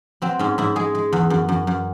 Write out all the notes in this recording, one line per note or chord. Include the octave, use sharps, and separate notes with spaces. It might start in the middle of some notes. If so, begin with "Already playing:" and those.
F#3 C4
G#2 C#4
G#2 E4
G#3 G#4
G#3
E2
F#2
F#2
F#2